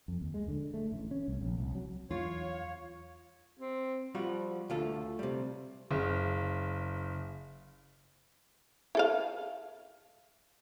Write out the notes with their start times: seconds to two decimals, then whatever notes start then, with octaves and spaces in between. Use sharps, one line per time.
0.08 F2
0.21 D#2
0.34 G#3
0.48 D3
0.74 A3
0.92 A1
1.11 C#4
1.28 C2
1.41 A#1
1.59 C2
1.75 F#3
2.11 E2 E3 F#3 F4 C#5 F5
3.59 C4
4.15 F3 G3 F4 F#4
4.70 D2 A3 F4 A4
5.19 C3 G3
5.91 F#1 C#3
8.95 E4 A4 F5